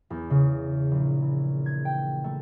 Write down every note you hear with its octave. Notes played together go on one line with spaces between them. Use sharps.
E2
C#3
A#1
E3
G#6
G5
A3